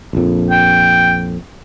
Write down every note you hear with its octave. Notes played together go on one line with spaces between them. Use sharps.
A#1 F2
G5